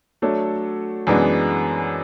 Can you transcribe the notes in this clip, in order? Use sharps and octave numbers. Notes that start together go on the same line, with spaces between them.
F#3 A3 D4 A4 C#5
F#2 E3 G#3 B3 D4